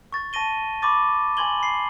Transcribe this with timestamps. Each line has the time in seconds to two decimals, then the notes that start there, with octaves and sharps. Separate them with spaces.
0.13 C#6 A6
0.33 A5 C#6 A#6 D#7 G7
0.82 B5 C#6 D6 A6
1.37 G#5 B5 C6 G#6 F#7 G7
1.60 B5 C7